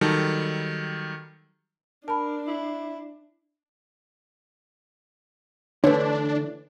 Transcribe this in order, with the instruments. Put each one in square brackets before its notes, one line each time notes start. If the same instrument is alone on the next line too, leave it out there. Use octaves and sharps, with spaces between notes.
[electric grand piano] D#3 F#3 G3 A4
[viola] D4 [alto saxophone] A#4 [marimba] A5 B5
[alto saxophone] E4
[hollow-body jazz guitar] D3 E3 A3 [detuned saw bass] D4 [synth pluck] B4 C#5